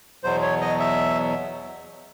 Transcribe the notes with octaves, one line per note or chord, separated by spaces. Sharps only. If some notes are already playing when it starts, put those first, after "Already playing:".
E2 B2 F#3 C5
C#5
D#5
E5